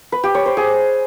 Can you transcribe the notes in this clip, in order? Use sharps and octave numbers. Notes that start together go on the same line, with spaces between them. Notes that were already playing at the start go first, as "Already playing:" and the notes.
B4
G4
C#5
C5
G#4